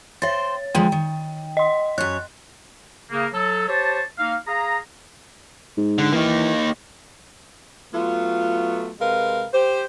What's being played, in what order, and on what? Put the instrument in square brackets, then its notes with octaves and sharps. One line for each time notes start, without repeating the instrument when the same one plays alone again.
[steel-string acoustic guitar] C5 G5 [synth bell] C#5 A6
[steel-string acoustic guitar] D3 F3 G#3 [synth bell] G5
[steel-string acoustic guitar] D#3
[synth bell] D#5 C6
[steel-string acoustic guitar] F#2 C#5 [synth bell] F#6
[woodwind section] C#3 A#3
F#3 A4
G4 C5 C#5 A5
A#3 D#4 F5
G#4 F5 A#5
[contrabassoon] G#2
[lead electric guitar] D3
[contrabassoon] E3 [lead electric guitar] A#3 D#4
[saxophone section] F#3 A3 B3 F4
C3 G#3 A#4 B4 F5
G4 C5